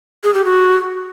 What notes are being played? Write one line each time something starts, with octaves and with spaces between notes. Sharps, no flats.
G#4
G4
F#4